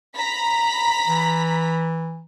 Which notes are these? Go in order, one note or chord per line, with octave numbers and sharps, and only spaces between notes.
A#5 B5 B6
E3